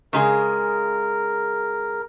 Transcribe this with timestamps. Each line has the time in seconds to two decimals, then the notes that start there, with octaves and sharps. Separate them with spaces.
0.13 C#3 G#3 G#4 A#4